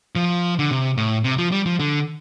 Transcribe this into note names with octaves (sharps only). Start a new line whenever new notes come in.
F3
D3
C3
A2
C3
F3
G3
F3
D3